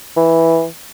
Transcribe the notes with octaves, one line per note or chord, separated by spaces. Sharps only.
E3